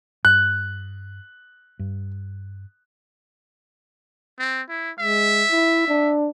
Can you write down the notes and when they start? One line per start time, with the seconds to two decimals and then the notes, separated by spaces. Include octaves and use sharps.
0.25 G2 F#6
1.79 G2
4.39 C4
4.69 E4
4.99 G#3 E5
5.51 E4
5.88 D4